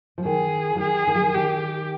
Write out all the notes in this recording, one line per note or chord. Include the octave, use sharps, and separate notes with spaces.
F3
D#3 G#4
F3
D#3 G#4
D#3
F3
D#3
D#3 G4